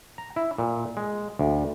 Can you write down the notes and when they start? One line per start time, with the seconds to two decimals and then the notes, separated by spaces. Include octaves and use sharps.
0.18 A#5
0.36 E4
0.58 A#2
0.97 G#3
1.39 D2